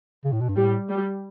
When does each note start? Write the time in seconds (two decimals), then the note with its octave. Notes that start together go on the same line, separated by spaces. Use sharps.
0.25 C#3
0.32 A2
0.41 B2
0.49 G2
0.56 A2 G3
0.89 G3